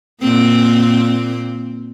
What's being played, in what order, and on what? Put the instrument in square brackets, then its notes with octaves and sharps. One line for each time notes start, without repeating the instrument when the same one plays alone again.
[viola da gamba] A#2 A#3 C4